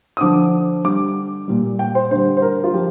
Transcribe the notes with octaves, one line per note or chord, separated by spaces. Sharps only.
D#6
D3 F3 D6
D3 G3 D6
A#2 G3
G5
C5
D3 G3 C5
C5
A#4
F4
F3 G4